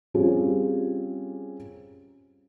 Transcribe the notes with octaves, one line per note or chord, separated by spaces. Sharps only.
G3 C4 C#4 F4 G4 G#4